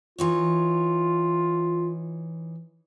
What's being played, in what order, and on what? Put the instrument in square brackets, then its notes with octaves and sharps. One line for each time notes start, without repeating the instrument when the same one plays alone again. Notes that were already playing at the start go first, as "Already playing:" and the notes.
[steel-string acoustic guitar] E3 D#4 C#5 [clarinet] F4